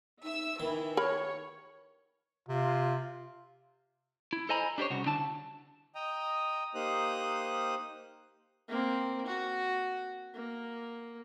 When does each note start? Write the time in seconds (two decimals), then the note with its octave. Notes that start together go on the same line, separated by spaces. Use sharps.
0.23 D#4 E5 E6
0.60 D#3 E3 E4
0.97 A#4 C#5 B5
2.49 C3 F4
4.33 E4
4.49 A4 C5 D#5 G#5 A#5 B5
4.78 D4 G4 A4 C5 C#5
4.90 C2 C#3 F#4
5.06 D3 D4 E4 A5
5.95 D#5 G5 A#5 D#6
6.75 A#3 D#4 G4 C5 D#6 F#6
8.68 A#3 C4
9.26 F#4
10.34 A#3